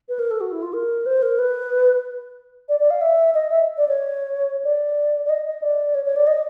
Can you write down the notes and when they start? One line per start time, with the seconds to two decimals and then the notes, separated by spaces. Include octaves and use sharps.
0.09 B4
0.19 A#4
0.31 A4
0.41 F#4
0.52 E4
0.62 F4
0.73 A#4
1.06 C5
1.22 A#4
1.39 B4
2.69 D5
2.80 D5
2.90 F5
3.01 E5
3.34 D#5
3.51 E5
3.78 D5
3.88 C#5
4.65 D5
5.25 D5
5.29 D#5
5.46 D#5
5.62 D5
5.95 C#5
6.05 C#5
6.16 D5
6.27 D#5